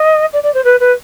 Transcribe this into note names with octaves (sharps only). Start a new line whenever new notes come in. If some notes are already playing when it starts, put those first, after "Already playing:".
Already playing: D#5
D5
D5
C5
B4
B4